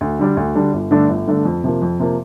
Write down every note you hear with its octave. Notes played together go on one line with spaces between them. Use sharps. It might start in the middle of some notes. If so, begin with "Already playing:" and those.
D2
D3 G3 D4
D2
D3 G3 D4
G1
G2 D3 A3 D4
G1
G2 D3 A3 D4
F2
C3 F3 A#3
F2
C3 F3 A#3